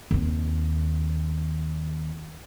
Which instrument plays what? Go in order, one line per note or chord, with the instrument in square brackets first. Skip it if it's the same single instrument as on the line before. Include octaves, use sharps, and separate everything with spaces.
[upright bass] D#2 C4